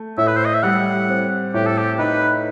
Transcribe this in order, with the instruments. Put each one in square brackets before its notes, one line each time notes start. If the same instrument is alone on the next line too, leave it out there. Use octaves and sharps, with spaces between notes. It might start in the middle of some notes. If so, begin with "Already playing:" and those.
Already playing: [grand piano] A3
[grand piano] A2 [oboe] E5
[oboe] B4
C5
D#5
E5
[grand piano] G3 [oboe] F#5
[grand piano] C4
[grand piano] A2 [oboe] G4
[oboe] A4
G4
[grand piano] D#4 [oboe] B4